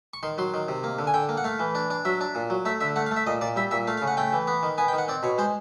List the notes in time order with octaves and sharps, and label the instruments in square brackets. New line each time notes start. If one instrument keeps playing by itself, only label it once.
[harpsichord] C#6
D#3 C6
F#3 C6
D#3
C3
A#3
D3
G#5
D3 G5
A#3
F#5
A3 F5
E3
D4
D4
F#3 E5
D4
A#2
F#3
A3 E5
D3 E5
A3 F#5
F5
A3
E5
A#2 D#5
A#2 D5
G3 E5
A#2 E5
A3 F5
F5
C#3
F#5
A3 G5
E3
B3
D#3
B3 G#5
G5
D#3
F#5
C4 D5
B2 C#5
G#3 C5